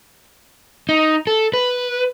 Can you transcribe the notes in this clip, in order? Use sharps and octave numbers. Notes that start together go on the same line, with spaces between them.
D#4
A4
B4